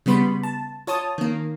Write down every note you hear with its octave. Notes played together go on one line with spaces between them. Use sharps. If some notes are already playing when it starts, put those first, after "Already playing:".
C#3 G3 B3 B5 C6
A5
F4 C#5 A5 D#6
D#3 A#3